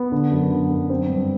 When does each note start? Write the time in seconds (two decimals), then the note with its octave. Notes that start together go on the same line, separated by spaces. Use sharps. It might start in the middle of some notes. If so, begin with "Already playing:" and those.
Already playing: B3
0.12 D3
0.31 F#2
0.51 D3
0.70 F#2
0.90 C4
1.09 G2